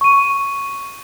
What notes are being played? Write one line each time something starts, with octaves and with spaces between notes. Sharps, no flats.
C#6 D#7